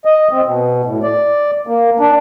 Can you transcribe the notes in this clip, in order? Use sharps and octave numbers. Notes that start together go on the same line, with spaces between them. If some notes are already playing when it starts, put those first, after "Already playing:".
D#5
C4
B2
A2
D5
A#3
D4